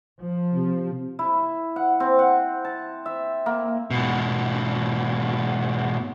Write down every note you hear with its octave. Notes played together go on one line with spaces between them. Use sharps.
F3
C3
E4
F#5
C4
F#5
A5
E5
A#3
G#2 B2